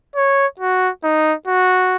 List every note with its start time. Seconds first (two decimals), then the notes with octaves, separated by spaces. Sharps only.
0.16 C#5
0.59 F#4
1.04 D#4
1.48 F#4